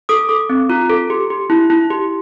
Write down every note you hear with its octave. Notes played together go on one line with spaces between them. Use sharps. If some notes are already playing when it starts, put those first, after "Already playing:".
A4 D#6
A4 D6
C4
F4
A4
G4
G4
E4
E4
G4